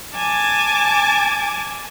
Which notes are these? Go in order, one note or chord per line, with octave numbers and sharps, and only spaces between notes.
G#5 A5 D6 G#6